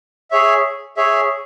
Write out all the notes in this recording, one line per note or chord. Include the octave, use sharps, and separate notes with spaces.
G#4 C#5 E5
G#4 C#5 E5